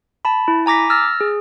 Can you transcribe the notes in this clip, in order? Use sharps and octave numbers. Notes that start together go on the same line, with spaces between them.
A5 B5
E4
G#5 A#5 D6 A#6 B6
E6 F6 A6 A#6
G#4